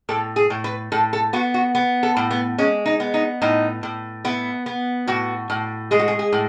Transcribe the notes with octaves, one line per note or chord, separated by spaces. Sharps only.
A2 A4
G#4
A2
B4
A2 A4
A4
B3 F#4
F#4
B3
A4
A2
B3
G#3 C#4
D#4
B3
D#4
A2 D#4
A2
B3 E4
B3
A2 F#4
A2
G#3 G#4
F#4
G#4
G#4
A2